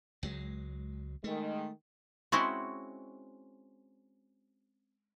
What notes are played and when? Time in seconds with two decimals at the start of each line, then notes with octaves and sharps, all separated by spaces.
0.23 C#2 F#3 G#3
1.24 D#3 G#3 A3
2.32 G#3 C4 C#4 E4 F#4